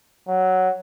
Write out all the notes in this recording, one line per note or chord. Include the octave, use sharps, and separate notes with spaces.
F#3